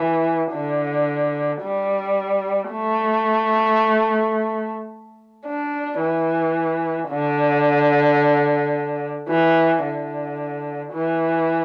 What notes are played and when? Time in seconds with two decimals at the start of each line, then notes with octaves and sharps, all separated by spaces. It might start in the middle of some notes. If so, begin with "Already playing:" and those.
Already playing: E3
0.53 D3
1.62 G3
2.72 A3
5.46 D4
6.01 E3
7.10 D3
9.29 E3
9.83 D3
10.93 E3